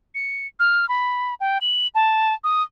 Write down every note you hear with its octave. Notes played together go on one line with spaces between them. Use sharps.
C#7
F6
B5
G5
F#7
A5
D#6